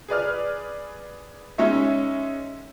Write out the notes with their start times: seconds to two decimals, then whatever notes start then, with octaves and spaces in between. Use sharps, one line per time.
0.08 G#4 B4 D5 F6
1.58 G#3 C#4 D#4 C#5 E5